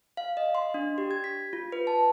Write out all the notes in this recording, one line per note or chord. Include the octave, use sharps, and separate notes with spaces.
F5
D#5
C6
D4
G4
G#6
B6
F4
B4
A5